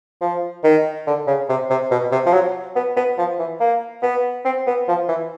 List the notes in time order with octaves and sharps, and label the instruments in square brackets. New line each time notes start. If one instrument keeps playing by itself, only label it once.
[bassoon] F3
D#3
D3
C#3
C3
C3
B2
C3
F3
F#3
B3
B3
F3
E3
A#3
B3
C4
B3
F3
E3